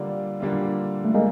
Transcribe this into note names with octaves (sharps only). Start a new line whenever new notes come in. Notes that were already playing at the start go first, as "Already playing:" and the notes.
Already playing: D3 G3 A#3 D4 F4
D3 G3 A#3 D4 F4
A3
G#3 A#3